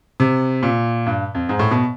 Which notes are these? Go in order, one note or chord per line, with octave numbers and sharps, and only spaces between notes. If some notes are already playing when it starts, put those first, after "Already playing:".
C3
A#2
G2
F2
G#2
A2
B2